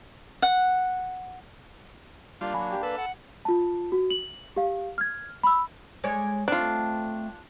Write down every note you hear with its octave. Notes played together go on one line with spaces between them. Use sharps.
F#5
G3 A#3 D4 F4
F#3 F5 G#5 B5
G4
A4 B4
F#5
F4 A5
F#4
F#7
G4 F5
F6 G#6
B5 E6
G#3 C#5 D5
A3 C4 D4 F4